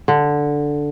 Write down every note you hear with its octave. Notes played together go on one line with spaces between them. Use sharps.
D3